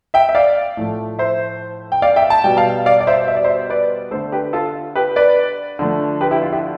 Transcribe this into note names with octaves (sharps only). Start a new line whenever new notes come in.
E5 G5
E5
D5 F5
A2 F3 A3
C5 E5
G5
D5 F5
E5 G5
A5
B2 G3 G5
F5 A5
D5 F5
D5
C5 E5
E5
D5
C5 E5
B4 D5
D3 A3 A4 C5
G4 B4
F4 A4
G4 B4
B4 D5
D3 F3 A3
G4 B4
E4 G4
F4
E4 G4